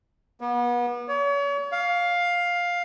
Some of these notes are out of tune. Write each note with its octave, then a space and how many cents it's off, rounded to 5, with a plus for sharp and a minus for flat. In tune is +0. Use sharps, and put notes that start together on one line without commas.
B3 -35
C#5 +35
F5 +10